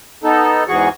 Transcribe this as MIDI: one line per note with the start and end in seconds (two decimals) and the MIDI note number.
0.24 0.64 59
0.24 0.64 63
0.24 0.64 69
0.68 0.89 40
0.68 0.89 44
0.68 0.89 52
0.68 0.89 66
0.68 0.89 68
0.68 0.89 85